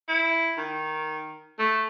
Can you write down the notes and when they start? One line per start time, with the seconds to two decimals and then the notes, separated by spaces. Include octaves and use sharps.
0.08 E4
0.58 D#3
1.59 A3